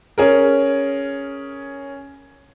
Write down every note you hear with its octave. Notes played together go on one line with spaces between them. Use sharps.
C#4 G#4 A#4